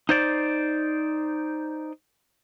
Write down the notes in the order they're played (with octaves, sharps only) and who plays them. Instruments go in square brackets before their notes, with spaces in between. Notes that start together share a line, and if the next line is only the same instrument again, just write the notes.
[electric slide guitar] D#4 C5 D5